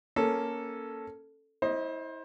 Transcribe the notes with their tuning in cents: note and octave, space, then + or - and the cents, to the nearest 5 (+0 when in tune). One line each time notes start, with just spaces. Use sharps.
A#3 +5 C#4 +0 A4 +0
E4 -30 C5 +25 D#5 +0